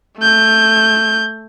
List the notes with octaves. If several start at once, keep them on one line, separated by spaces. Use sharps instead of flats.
A3 G6